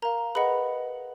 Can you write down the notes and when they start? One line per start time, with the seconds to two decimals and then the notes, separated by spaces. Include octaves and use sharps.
0.02 A#4 F5 A#5
0.35 G#4 B4 D#5 F#5 B5